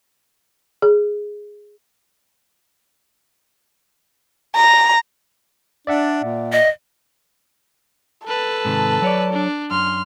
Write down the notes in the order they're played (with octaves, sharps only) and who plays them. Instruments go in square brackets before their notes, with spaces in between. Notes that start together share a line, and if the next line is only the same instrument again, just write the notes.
[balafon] G#4
[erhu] A#5
[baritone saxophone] D4 [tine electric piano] D5 E5 F#5
[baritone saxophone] A#2
[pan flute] D#5
[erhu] A4 [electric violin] B4 A5
[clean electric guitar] G#2 C3 D#3
F#3 C#5 D5
[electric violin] D4
[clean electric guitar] F#2 [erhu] C6 [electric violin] F6